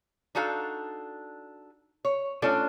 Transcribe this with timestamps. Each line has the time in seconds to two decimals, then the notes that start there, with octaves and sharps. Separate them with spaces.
0.35 D4 D#4 F#4 A4 F5
2.05 C#5
2.42 A3 C#4 D4 F4 A4 D5